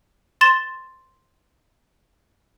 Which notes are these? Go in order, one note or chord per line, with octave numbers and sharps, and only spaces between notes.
C6 A6 E7 G7